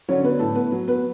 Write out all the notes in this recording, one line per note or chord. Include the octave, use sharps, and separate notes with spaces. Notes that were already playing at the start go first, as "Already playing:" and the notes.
D3 F#3 C#4 C#5
B3 B4
A2 A3 A4
B3 B4
F#3
B3 B4